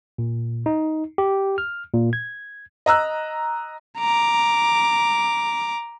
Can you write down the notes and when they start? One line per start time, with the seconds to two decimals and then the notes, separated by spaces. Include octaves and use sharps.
0.18 A#2
0.66 D#4
1.18 G4
1.58 F6
1.94 A#2
2.13 G#6
2.86 D#5 A#5 E6 F#6
3.99 A#5 D6